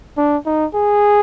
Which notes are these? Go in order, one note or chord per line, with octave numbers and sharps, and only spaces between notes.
D4
D#4
G#4